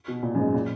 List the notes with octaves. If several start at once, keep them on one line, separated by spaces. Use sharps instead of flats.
B2
A#2
F#2
G#2
A#2